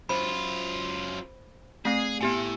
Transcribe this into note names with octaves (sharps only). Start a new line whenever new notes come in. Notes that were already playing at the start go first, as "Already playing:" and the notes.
F#2 F4 C5 B5
A3 C4 G#4 C7
A2 B3 G4 G#5